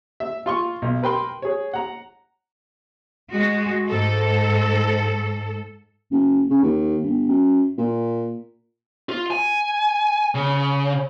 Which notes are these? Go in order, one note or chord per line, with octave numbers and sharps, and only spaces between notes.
E5
F4 C6 C#6
B1
A#4 B4 G5 C6
G#4 C#5
F#5 A#5
G#3 F#4
G#2 A4
F#1
C#3
D#2
G1
F#2
A#2
F4
G#5
C#3